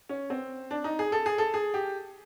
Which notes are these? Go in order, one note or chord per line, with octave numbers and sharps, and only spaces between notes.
C#4
C4
D4
D#4
G#4
A4
G#4
A4
G#4
G4